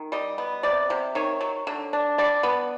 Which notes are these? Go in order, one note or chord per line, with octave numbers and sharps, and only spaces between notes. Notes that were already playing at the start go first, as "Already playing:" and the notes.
Already playing: D#3
G3 D#5
B3
C3 D5
C3
D#3 C#5
F#3
D3
D4
G3 D5
B3